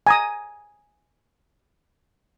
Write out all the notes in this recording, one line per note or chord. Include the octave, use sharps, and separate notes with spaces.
G#5 A#5 D#6